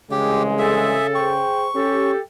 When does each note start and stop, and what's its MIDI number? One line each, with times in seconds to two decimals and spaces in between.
0.11 0.97 36
0.11 1.49 49
0.11 0.97 52
0.11 0.97 56
0.11 0.43 67
0.59 1.07 68
0.59 1.36 69
0.59 1.07 76
1.15 1.67 68
1.15 1.67 72
1.15 1.67 79
1.15 2.11 85
1.75 2.13 61
1.75 2.19 67
1.75 2.20 69